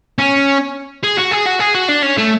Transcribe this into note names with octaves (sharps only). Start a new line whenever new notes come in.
C#4
G#4
F#4
G#4
F#4
G#4
F#4
D4
C#4
A3